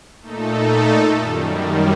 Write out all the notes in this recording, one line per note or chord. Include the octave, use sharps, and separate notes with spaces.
A#2 A3 D#4 A4
F#2 D#3 G3